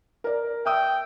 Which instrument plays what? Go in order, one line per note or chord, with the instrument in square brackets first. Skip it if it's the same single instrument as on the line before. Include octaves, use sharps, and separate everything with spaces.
[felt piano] A#4 D5
[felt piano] E5 D#6 E6 [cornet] G5